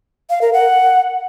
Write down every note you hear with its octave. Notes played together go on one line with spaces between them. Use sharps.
F5
A#4
F#5